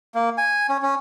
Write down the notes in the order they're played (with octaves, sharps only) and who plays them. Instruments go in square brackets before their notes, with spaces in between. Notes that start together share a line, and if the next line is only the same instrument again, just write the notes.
[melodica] A#3
G#5
C#4
C#4